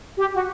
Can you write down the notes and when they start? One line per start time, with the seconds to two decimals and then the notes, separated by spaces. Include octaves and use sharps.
0.18 G4
0.34 F#4